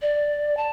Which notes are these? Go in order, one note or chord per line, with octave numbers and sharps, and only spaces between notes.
D5
A5